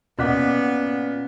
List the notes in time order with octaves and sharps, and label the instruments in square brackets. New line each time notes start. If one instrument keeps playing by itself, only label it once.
[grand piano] A#2 [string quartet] B3 [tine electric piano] C#4 F#6 B6 [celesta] D#5 F#5 D6